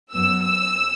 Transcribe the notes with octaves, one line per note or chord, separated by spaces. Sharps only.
F#2 F#3 B3 E6
E6